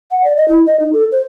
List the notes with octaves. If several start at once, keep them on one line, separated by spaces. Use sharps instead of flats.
F#5
D5
D#5
E4
D#5
D#4
A4
C5